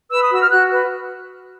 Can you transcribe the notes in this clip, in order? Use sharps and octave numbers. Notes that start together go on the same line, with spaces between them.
B4 E6
D#6
F#4 E6
F6
F#4 F#6
B4